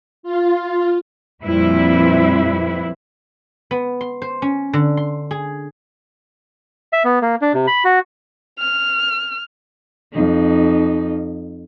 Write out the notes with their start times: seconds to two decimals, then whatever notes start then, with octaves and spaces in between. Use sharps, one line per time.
0.23 F4
1.44 F2 A#2 G3 C4 E4 B4
3.71 B3
4.01 C6
4.22 C5
4.42 C#4
4.73 D3
4.97 C6
5.31 G#4
6.93 E5
7.04 B3
7.22 A#3
7.42 D4
7.54 C3
7.67 B5
7.85 F#4
8.59 F6
10.12 F2 D#4